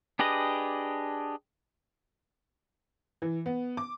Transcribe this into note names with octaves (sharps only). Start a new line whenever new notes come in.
D4 G4 G#4 B4 D#5
E3
B3
D6